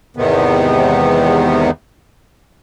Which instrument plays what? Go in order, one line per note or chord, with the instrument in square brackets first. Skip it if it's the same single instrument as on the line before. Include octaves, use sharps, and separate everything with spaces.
[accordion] E2 G#2 C3 D#3 B3